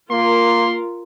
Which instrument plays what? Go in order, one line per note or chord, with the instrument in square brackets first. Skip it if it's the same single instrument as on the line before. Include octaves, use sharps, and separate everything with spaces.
[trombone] A#3 [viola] F4 A#4 [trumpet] C6